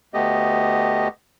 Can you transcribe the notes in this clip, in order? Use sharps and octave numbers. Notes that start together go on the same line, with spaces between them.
D2 A3 B3 G4 D#5